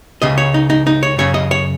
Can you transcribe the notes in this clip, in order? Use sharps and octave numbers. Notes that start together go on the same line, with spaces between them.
C#2 C#3 D#5
C#5
D#4
D#4
D#4
C#5
F#2 C#3 C#5
D#5
C#5